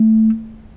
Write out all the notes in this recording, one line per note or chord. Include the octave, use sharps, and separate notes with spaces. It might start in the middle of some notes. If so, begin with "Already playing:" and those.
Already playing: A3